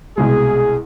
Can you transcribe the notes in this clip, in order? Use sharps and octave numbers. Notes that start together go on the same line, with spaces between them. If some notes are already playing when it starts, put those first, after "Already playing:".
C2 B2 G#3 G#4